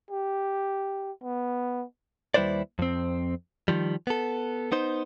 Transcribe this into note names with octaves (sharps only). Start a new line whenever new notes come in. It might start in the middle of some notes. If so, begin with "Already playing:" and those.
G4
B3
D#2 G3 E4 B4 C5 D5
F2 C4
D#3 F3 G3
B3 A4
B3 D#4 C5